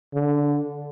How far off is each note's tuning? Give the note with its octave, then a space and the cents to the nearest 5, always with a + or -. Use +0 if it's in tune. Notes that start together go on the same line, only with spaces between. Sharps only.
D3 -15